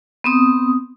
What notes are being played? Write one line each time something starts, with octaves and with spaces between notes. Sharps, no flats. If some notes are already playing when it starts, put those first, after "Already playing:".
B3 C4 D#6